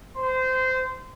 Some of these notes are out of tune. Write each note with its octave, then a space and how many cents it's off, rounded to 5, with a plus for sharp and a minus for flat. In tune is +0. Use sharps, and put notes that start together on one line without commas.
C5 -20 C6 -25